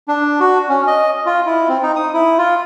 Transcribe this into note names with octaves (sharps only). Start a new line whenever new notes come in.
D4
F#4
C#4
D#5
F4
E4
C4
D#4
D#6
E4
F4